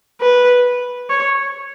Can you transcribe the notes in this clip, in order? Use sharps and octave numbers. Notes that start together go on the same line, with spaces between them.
B4
C#5